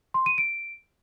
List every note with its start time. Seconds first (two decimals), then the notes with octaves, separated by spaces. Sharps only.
0.14 C6
0.26 D#7
0.38 D7